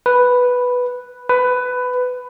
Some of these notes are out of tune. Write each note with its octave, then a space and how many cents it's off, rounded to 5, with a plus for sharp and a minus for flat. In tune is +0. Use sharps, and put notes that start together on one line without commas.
B4 +0
B4 +15